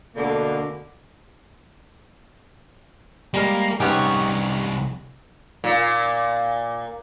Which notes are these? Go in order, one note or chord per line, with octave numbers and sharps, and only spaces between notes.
D2 B2 D3 A#3 A#4
G3 G#3 A#3 A#4
C2 B3 C#4 D#4 G4 G#4 C#5 F#5
A#2